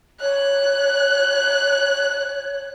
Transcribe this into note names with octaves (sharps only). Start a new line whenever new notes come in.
C#5 F#6